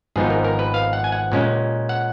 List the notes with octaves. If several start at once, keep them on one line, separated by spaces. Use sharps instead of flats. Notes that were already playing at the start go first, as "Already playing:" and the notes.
G#1 G#2 F3 B3 D#4 G#4
A#4
A#4
B4
F5
F#5
G#5
F#5
A#2 G#3 C#4
F#5